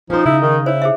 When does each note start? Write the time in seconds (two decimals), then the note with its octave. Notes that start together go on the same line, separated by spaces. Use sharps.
0.10 F3 C#4 D#4 C5
0.26 C#3 E4
0.42 D#3
0.66 E4 C5 C#5
0.82 G#4 C5 E5